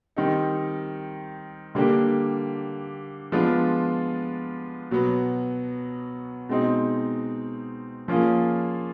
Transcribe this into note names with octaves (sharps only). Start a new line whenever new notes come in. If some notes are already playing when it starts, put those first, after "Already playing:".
D#3 G3 C4 D#4
D3 G3 A#3 D4 G4
F3 G#3 B3 D4 F4
B2 F#3 B3
B2 G#3 C4 D#4
F3 A#3 C#4 F4 G#4